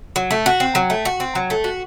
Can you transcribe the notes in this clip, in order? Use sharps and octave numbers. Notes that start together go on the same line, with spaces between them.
F#3
A3
F#4
C4
F#3
A3
F#4
C4
F#3
A3
F#4